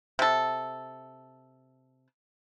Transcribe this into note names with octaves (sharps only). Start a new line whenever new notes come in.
C3 A4